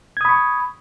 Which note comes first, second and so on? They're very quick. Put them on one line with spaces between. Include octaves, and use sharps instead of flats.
G#6 D#6 B5 C#6